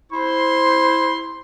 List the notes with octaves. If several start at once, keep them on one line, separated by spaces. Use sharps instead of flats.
E4 C5 C6